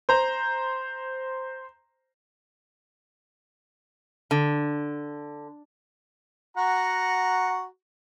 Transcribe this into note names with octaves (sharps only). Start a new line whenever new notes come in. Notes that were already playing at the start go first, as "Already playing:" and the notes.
C5 A#5
D3
F#4 F#5 A#5